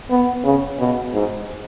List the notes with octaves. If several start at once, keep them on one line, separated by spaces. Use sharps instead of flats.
B3
C#3
B2
G#2